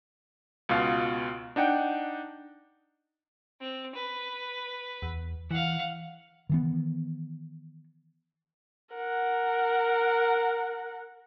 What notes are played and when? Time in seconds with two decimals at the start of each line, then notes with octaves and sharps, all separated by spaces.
0.69 C#2 B2 F4 F5
1.56 D4 D#4 F#5 G5
3.61 C4
3.95 B4
5.02 E2
5.51 E3 F5 F#5
6.49 D#3 E3 B3
8.95 A#4 F#5